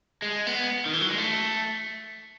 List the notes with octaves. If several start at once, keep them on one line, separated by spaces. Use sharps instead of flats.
G#3
B3
D#3
E3
F#3
G#3
A3